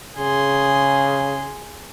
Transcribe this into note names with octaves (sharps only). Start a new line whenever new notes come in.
C#3 G#4 C6